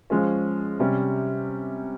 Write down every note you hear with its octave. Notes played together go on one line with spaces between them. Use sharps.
F3 G#3 C#4
C3 G3 C#4